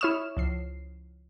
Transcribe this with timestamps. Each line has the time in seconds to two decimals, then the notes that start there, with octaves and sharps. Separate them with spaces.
0.01 E4 C#5 C#6 D#6 F6 E7
0.37 C#2 F3 C7